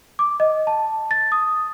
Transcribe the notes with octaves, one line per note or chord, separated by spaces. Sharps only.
D6
D#5
A5
A6
D#6